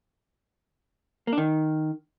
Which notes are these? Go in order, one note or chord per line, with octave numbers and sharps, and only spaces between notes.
A#3
D4
D#3